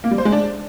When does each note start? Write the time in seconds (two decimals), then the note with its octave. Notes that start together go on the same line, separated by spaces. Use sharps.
0.04 A#3
0.11 G3
0.18 C5
0.25 G#3
0.32 D4